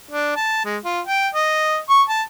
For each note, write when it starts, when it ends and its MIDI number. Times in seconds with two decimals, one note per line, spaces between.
0.11 0.35 62
0.36 0.63 81
0.65 0.77 56
0.85 1.00 65
1.06 1.28 79
1.35 1.79 75
1.89 2.03 85
2.09 2.22 81